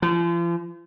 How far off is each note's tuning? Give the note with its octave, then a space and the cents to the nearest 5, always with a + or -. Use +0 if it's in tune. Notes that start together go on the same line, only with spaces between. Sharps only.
F3 -40